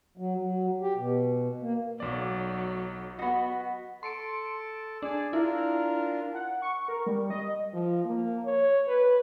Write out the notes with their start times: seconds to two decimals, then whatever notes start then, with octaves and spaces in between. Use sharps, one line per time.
0.17 F#3
0.40 F#3
0.82 G4
0.97 B2
1.62 A#3
2.00 B1 F#3 D5
3.19 B3 F#4 D#5 B5
4.03 A4 A5 C6 C#7 D7
5.02 D4 G#4 D5
5.33 D4 E4 F4 A#4
6.34 F#5
6.62 C#6
6.88 A#4
7.06 G3
7.30 D#5
7.73 F3
8.05 A#3
8.45 C#5
8.88 B4